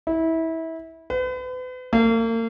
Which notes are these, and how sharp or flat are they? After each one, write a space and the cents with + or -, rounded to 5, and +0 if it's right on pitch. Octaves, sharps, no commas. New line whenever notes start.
E4 -25
B4 +40
A#3 -40